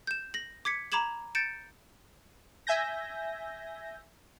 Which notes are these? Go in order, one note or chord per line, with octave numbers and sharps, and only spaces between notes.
G6 E7
A#6 F#7
D6 G#6 B6 C#7
A#5 B5 D6 G#6 E7 F#7
G6 A6 C#7 D7 E7
E5 G#5 G6 A#6